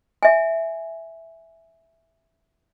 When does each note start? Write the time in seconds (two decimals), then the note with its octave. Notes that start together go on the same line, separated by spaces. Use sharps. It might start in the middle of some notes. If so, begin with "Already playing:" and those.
0.23 E5 G#5